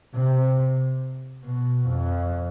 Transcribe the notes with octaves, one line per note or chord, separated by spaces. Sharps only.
C3
B2
F2